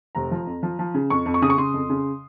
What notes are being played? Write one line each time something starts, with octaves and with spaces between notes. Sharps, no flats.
F1 A#5
F3
F2
F3
F3
C#3
F2 C#6
F2
C#6
C#3 D#6
C#6
C#3 C6
F2
C#3